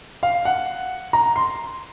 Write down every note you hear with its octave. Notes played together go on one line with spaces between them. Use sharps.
F5
F#5
A#5
C6